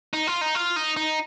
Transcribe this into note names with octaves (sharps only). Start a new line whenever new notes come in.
D#4
F4
D#4
F4
D#4
D#4